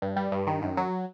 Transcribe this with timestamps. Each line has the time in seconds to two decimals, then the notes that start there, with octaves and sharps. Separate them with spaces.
0.02 G2
0.16 G3
0.32 G2
0.47 D#3
0.62 F#2
0.77 F#3